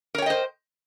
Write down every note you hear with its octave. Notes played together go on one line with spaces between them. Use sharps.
A#4 C5 C#5 D#5 G5